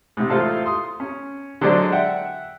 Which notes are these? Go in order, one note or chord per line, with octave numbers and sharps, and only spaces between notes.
G#2 C3
A1 F4 A4 C5 F5 A5
C6 D#6
C#4
D3 F#3 G#3 D4 C5 D5
E5 F#5 G5